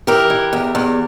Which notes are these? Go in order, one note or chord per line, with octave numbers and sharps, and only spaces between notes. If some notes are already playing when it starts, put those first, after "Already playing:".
E3 G4 A#4
E3
E2
E2